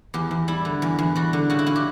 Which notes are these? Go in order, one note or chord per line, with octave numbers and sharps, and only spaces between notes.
E2 G4
E2
G3 E4
D3
E2
E2
G3 F#4
D3
C#3 F#4
E4
C#3 F#4
G4